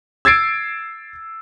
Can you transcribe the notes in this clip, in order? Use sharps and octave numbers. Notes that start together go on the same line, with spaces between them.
E6 G#6 A6 C7 D7